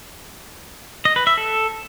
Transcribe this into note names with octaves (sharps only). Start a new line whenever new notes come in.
D#5
B4
E5
A4